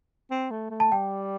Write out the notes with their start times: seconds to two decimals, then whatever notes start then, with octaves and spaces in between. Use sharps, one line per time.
0.31 C4
0.51 A3
0.71 A3
0.80 A5
0.92 G3 G5